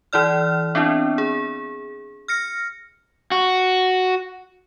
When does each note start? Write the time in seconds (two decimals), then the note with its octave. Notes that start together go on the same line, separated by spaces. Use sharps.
0.13 E3 E4 D5 F6
0.75 B3 C4 D4 E4
1.18 G#4
2.28 F6 A#6 C#7
3.31 F#4